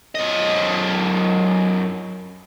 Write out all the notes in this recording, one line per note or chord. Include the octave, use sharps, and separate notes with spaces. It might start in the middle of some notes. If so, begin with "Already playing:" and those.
F#2 D#5